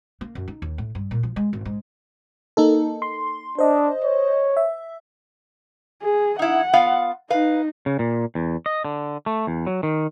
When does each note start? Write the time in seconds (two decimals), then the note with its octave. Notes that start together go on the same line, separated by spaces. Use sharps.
0.21 A#3
0.35 F#2
0.48 D#4
0.62 D#2
0.78 A2
0.95 G2
1.11 A#2
1.23 F3
1.36 G#3
1.53 G#1
1.65 G#2
2.57 A#3 D#4 A4
3.02 C6
3.59 D4 C5 D#5
4.04 C#5
4.57 E5
6.02 G#4
6.39 D#4 E4 F#5
6.73 B3 F4 F5
7.30 D#4 B4 F5
7.86 C#3
7.99 A#2
8.35 E2
8.66 D#5
8.85 D3
9.26 A3
9.47 E2
9.67 F#3
9.83 D#3